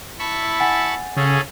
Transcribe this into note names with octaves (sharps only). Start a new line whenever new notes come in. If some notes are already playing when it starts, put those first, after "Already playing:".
E4 A5 B5 C#6
F#5 G#5 A6
C#3 C#4 G#4 A4